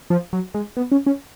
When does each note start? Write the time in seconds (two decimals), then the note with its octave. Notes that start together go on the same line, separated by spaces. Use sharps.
0.10 F3
0.33 F#3
0.54 G#3
0.77 B3
0.92 C#4
1.06 C#4